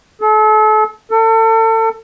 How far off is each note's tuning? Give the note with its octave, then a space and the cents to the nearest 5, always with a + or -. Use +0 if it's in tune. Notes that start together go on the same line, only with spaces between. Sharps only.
A4 -35
A4 +35